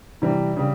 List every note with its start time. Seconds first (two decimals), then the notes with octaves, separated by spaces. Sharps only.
0.22 C3 E3 G3
0.57 C#3 G3